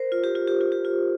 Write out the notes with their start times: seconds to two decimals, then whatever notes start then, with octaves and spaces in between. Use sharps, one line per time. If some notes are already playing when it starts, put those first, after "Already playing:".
Already playing: A#4 C5
0.12 F4
0.24 G4
0.35 F4
0.47 G4
0.61 F4
0.72 G4
0.85 F4